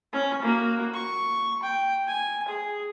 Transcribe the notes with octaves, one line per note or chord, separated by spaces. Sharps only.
C#4
A#3 F#4
C#6
G5
G#5
G#4